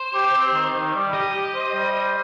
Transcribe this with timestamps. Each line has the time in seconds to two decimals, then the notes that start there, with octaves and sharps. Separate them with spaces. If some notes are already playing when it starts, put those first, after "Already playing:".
Already playing: C5
0.14 G4
0.33 C4
0.53 D#3
0.74 D#3
0.94 G3
1.14 G4 D#5
1.33 G4
1.54 C5
1.73 G3
1.94 C5